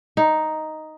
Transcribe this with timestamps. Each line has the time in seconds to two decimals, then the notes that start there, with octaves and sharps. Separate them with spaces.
0.17 D#4